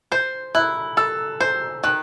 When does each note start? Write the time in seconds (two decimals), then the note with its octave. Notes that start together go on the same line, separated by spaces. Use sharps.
0.12 C5 G6
0.55 E4 F#6
0.97 A4 E6
1.41 C5 G6
1.84 D#3 F#6